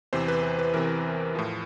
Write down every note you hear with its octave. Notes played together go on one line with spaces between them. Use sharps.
E2 C3 E3 C5
B4
B4
B4
E2 C3 E3 A#4
A2 F3